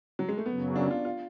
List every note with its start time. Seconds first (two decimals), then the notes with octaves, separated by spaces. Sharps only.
0.19 F#3
0.29 G#3
0.37 A3
0.46 F#2 C#3 F#3 B3
0.76 D4
0.91 F4
1.05 F4